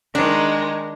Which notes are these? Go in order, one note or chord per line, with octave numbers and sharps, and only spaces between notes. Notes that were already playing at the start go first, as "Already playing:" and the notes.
D#3 G#3 D4 D#4